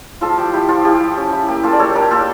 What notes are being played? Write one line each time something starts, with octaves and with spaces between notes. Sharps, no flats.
F3 F4 A4
F3 G4
E4 G4
F3 F4
E4 G4
F3
C#4
E4
A#3 G4
A#3 F4 A4
D5
A#3 A4 C#5
D4 G4 A#4
A#3 F4 A4